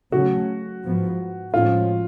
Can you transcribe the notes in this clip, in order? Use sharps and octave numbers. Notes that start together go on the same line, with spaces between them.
C#3 F#3 A3 C#4 F#4
G#2 F3 B3
A2 F3 G#3 C#4 F4